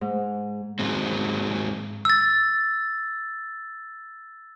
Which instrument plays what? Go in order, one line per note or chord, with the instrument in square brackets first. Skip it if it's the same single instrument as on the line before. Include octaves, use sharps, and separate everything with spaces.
[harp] G#2
[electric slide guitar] G#2 F#3 G#3 C4
[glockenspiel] E6 A6